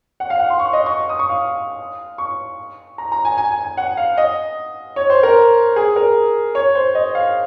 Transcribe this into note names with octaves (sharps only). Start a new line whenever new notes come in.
F#5
F5
F#5
C6
C#6
D#5
C#6
D#6
C#6
F5
C#6
A#5
A#5
G#5
G#5
G#5
G#5
F#5
F5
D#5
C#5
C5
A#4
G#4
A#4
C#5
C5
D#5
F5